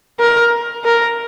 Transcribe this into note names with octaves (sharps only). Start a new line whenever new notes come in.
A#4
A#4